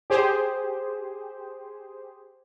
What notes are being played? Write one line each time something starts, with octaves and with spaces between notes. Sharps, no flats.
G4 G#4 C5